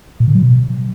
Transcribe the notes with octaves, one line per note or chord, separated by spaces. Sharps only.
A#2
D3
F#3
B2